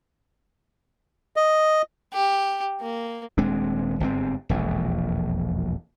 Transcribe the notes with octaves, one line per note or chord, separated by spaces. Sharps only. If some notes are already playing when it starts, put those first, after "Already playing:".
D#5
G4
A#3
D#1 G#3 C4 D4
G1 G#2 C4
E1 A#1 F2